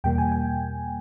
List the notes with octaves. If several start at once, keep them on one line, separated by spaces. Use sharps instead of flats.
E2 B2 G3 A#3 G5
G#5
G5